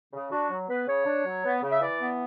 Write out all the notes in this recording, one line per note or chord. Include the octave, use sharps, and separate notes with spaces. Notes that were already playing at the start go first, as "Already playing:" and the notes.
C#3
D4 F#4
F#3
B3 B4
C#3 C#5
D4
F#3
B3
C#3
E5
E3 D5
B3